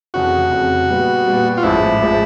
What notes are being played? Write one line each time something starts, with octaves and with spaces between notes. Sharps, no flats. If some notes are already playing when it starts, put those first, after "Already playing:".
F1 F2 C#3 E3 F#4
F1 F2 C#3 E3
A#2 G3 B3
A#2 G3 B3
F4
A1 G#2 F3 G#3 E4
A1 F3 G#3